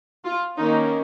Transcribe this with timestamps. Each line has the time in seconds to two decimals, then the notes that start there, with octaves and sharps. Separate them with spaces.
0.25 F4
0.58 D#3 A#3 C#4 D#4